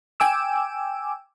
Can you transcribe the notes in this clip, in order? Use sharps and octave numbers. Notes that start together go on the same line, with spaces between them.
G5 G#5 D6 E6